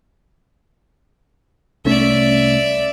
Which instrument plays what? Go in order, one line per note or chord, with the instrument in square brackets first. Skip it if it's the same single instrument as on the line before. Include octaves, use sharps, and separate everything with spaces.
[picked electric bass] C2 A3 C#4 [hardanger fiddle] D5 E5